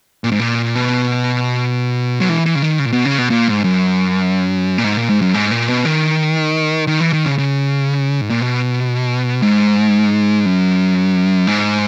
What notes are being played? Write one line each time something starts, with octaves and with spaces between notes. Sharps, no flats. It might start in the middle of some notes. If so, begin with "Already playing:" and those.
A#2
G#2
A#2
B2
F#3
E3
E3
C#3
D#3
C#3
A#2
B2
C#3
B2
A#2
G#2
F#2
A#2
G#2
A#2
G#2
F#2
G#2
A#2
B2
D#3
D#3
E3
D#3
C#3
C#3
G#2
A#2
B2
G#2
F#2
G#2